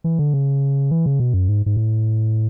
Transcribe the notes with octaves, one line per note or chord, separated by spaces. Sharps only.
E3
D3
C#3
E3
C#3
B2
F#2
G#2
G#2
A2